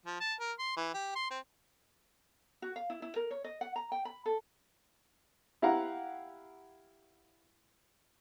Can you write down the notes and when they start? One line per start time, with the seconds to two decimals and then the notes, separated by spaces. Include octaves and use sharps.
0.06 F3
0.20 A5
0.40 A#4
0.59 C6
0.77 E3
0.94 G4
1.15 C6
1.31 C4
2.62 F#4
2.76 F5
2.90 E4
3.02 E4
3.16 A#4
3.31 C#5
3.44 D#5
3.61 F#5
3.76 A#5
3.92 G5
4.05 B5
4.26 A4
5.62 E4 G4 F5 F#5 A#5